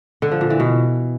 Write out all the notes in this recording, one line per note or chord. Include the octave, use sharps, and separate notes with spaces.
D3
F3
A#2
E3
B2